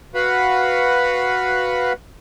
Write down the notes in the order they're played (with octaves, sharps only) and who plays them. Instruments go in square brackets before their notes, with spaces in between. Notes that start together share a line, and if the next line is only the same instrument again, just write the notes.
[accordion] F#4 B4 F5 F#5 B5